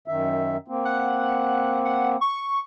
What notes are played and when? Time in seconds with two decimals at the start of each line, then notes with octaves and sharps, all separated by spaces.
0.08 F#2 D#3 E5
0.68 A#3 C4
0.85 F#5
1.85 F#5
2.21 C#6